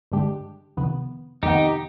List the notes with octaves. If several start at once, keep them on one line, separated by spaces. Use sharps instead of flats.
G2 D3 G#3 D4 G4
F2 C3 D#3 B3
F2 C3 D#3 B3 D#4 G4